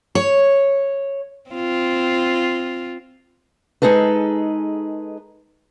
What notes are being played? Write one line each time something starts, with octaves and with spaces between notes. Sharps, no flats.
C#5
C4 F4
G#3 D#4 G#4 A4 B4